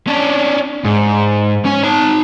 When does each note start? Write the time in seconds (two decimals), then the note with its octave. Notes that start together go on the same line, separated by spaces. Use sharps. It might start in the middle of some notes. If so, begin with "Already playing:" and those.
0.07 C#4 D4
0.85 G#2
1.65 C#4 C#5
1.83 D#4 A5